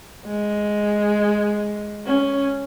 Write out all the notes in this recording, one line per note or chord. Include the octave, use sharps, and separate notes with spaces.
G#3
C#4